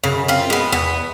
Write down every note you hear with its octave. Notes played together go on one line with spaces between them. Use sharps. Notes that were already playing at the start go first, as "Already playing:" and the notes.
F#2 C#3
C4 F4
G#3 B3
E2 B3